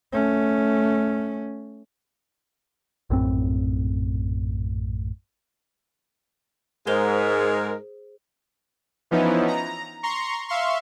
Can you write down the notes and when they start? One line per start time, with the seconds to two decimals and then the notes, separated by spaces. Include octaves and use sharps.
0.13 A3 C#4
3.10 A#1 F#2 A2 C4
6.87 G#2 G#3 D#4 G#4 A#4 C5 G7
9.11 E3 F3 B3 C#4 D#4 E4
9.48 A#5
10.03 A#5 C6 C#6
10.48 E5 F5 C6 C#6